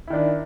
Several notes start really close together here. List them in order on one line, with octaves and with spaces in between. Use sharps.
E4 D#3 D4